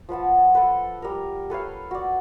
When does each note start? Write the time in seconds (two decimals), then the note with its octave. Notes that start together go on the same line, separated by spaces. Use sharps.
0.09 F3 B4 F#5 A5
0.55 A4 B4
1.02 G3 A#4
1.50 A4 B4 C#5 F5
1.91 F#4 D5